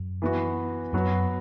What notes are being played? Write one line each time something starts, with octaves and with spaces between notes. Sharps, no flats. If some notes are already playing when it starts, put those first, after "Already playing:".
Already playing: F#2
E3 B3 F#4
F#2 F#3 B3 F#4